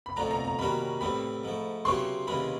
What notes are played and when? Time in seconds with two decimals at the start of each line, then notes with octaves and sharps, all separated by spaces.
0.06 B5
0.16 F2 D3 F3 A3 D4 A#5
0.31 A#5
0.45 A#5
0.59 D#3 G3 A#3 C#4 F#4 B5
1.01 A2 E3 G3 C4 B5
1.44 G#2 F3 A3
1.85 C#3 F#3 B3 E4 G4 C6
2.27 D#2 C#3 E3 G#3 C#4 B5